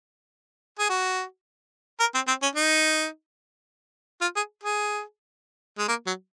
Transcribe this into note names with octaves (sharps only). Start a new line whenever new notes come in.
G#4
F#4
A#4
C4
C4
C#4
D#4
F4
G#4
G#4
G#3
A#3
F#3